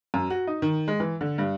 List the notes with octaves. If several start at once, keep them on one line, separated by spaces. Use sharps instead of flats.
F#2
F#4
D#4
D#3
G#3
E3
D3
G2